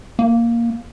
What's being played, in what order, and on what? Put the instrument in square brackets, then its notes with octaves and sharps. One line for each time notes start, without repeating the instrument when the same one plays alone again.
[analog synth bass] A#3